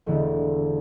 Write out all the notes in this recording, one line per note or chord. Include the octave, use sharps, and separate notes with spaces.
E1 E2 D3 A3 E4